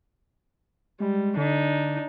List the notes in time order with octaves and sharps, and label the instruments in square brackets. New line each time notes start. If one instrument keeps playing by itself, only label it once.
[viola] G3 [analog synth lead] G#3
[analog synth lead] D3 [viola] D4 D#4